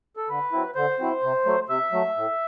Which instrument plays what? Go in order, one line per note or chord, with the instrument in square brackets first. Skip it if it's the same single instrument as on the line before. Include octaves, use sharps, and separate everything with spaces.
[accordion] A4
D3 B4
F#3 C4 E4
D3 C5
F#3 C4 E4
C3
F#3 A3
C3 E5
F#3 A3
A2